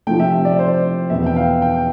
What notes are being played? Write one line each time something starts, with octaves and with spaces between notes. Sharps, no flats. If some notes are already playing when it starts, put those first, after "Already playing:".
C3 F3 A3 G5
E5
D5
C5
E2 B2 B3 E5
G5
F5
G5